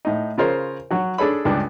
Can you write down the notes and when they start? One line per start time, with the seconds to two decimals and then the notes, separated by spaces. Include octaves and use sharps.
0.05 A2 D#4
0.38 C#3 F4 A#4 C5 C#5
0.91 F#3 F#4
1.18 D4 G#4 A4 C#5 B5
1.45 C#2 G2 D4